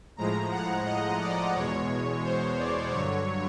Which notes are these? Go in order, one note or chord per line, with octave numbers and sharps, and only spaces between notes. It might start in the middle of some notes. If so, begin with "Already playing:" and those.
A2 F3 G#3 A#5
F#5
D#5
D5
E2 B2 G#3 C#5
C5
D5
G2 D3 F#3 C#5